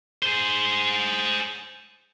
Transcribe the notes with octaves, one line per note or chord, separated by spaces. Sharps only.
G#4 C5